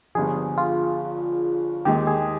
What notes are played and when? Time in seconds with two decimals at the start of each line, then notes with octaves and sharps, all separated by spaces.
0.15 G1 G2 F3 G#4
0.58 F4
1.85 D#2 D#3 G#3 D#4 G4
2.07 G#4